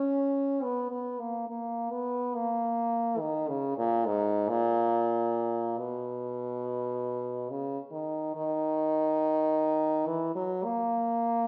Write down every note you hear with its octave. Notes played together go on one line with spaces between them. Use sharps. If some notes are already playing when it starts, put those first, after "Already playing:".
Already playing: C#4
B3
B3
A#3
A#3
B3
A#3
D#3
C#3
A#2
G#2
A#2
B2
C#3
D#3
D#3
E3
F#3
A#3